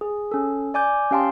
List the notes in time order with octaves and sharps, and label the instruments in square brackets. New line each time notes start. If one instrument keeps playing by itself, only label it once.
[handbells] G#4
C#4 A4
D5 G#5 D6 G6
C#4 G4 F5 G5 A5 C6